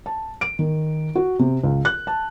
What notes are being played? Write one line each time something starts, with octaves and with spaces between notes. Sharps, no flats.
A5
D7
D#3
F#4
C3
C#2
F#6
A5